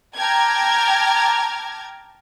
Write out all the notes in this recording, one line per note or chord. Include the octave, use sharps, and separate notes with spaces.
G5 A5 A#5 D6 F6 G#6